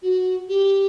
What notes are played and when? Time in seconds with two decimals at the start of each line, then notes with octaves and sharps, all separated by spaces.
0.03 F#4
0.49 G4